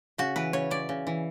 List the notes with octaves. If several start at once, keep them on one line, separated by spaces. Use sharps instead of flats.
C#3 F#4
E3 B4
C#3 C#5
C#3 D5
C#3
E3